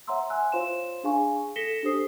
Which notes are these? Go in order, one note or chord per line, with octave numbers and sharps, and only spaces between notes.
C#5 E5 F#5 A#5 C6 E6
E5 G#5 E6 F#6
F4 C5 C#5 F5 C6 E7
D4 G#4 F5 G#5 C#6
A4 A#6 B6 C#7 E7 G7
D4 G4 A4 C5 D#6 C7